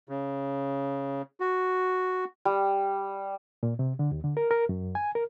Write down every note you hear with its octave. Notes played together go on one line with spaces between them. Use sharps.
C#3
F#4
G3
A#2
C3
D3
D#2
D3
A#4
A#4
F#2
G#5
A#4